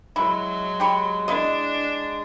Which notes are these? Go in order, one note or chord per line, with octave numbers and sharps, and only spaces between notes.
F#3 G#3 E4 F#4
G4 B5 C#6
D4 E4 D#5